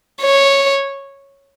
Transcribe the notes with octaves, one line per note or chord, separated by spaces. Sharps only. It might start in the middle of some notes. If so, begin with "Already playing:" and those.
C#5